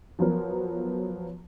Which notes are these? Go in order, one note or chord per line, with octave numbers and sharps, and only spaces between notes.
F3 F#3 B3 A#4